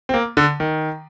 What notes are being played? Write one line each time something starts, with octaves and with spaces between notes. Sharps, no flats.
C4
A#3
D3
D#3